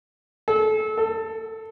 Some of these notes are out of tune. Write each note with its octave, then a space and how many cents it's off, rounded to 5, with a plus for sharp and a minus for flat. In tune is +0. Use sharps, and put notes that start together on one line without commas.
A4 -30
A4 +15